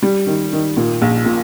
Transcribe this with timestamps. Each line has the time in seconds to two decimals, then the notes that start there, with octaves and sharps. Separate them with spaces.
0.03 G3
0.27 D#3
0.52 D#3
0.77 A#2
1.02 A#1
1.26 A#2